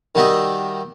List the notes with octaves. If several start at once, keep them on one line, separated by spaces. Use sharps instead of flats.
D#3 G3 F#4 G4 D#5 E5